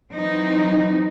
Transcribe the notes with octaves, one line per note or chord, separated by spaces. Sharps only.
E3 F#3 C4 D#4